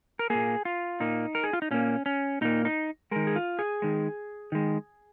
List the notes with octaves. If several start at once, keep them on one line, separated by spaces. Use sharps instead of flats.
A#4
A#2 A#3 G#4
F4
A#2 A#3 D#4
A#4
G#4
F4
D#4
A#2 A#3 C#4
C#4
A#2 A#3 D#4
D#4
D#3 G#3 A#4
G#4
F4
G#4
D#3 G#3
D#3 G#3